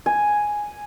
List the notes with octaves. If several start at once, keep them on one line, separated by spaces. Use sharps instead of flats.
G#5